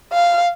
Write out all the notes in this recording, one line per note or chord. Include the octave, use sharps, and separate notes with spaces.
F5